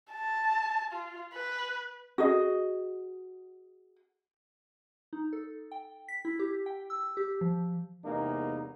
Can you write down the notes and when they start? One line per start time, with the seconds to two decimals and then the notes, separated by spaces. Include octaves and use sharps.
0.11 A5
0.93 F4
1.34 B4
2.18 F#4 G#4 D#5
5.13 D#4
5.33 A4
5.72 G5
6.08 B6
6.25 E4
6.39 G4
6.66 G5
6.90 E6
7.17 G4
7.41 F3
8.04 E2 C3 G#3 A#3 B3 D#4